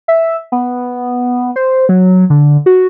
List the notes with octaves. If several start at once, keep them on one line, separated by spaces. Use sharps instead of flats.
E5
B3
C5
F#3
D3
F#4